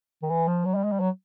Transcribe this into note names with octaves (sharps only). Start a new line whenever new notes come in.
D#3
E3
F3
F#3
G3
G#3
G3
F#3